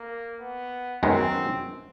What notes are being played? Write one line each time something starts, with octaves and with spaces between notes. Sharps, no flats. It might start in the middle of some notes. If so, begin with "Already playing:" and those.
Already playing: A#3
B3
F#2 D#3 G#3 B3 C4